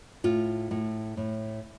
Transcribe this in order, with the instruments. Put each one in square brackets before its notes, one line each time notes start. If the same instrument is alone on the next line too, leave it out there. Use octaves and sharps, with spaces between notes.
[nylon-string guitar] A2 F4
A2
A2